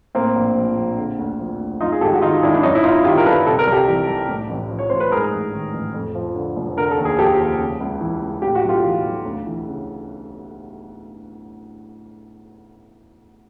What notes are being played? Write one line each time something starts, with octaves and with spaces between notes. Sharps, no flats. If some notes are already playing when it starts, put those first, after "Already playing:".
A2 A#3 C4
A#1
F3
A#1
D3
D2
F3
D2
F#2 D#4 F4
G#4
G#1 G4 A4
F#4
D#3 D#4 F4
G#1 D4 E4
D4
F#2 C#4 D#4
E4
G1 D#4 F4
D#3 F4 G4
A#4
G1 A4 B4
C3 A4
A#4
C2 G4 A4
E3
C2
A2
A1
F3
C#5
A1 C5
B4
G#2 G#4 A#4
A1
D#3
A1
F2
F3
D3
F1
D3 A#4
A4
D#2
G#4
F3 G4 A4
D#2
C#3
C#2
E3
C#2
A2 G4
F#4
B1
F4 G4
E3
B1
D2
E3
C#3